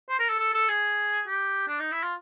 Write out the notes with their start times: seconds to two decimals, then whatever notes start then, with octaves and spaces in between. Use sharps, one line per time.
0.10 C5
0.19 A#4
0.29 A4
0.39 A4
0.54 A4
0.68 G#4
1.27 G4
1.68 D4
1.80 D#4
1.92 E4
2.03 F4